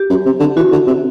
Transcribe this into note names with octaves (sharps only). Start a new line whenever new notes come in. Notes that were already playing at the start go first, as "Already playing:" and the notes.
Already playing: G4
F#2
C3
D3
E3 F#4
D3
C3